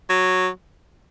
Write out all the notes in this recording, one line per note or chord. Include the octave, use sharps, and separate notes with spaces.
F#3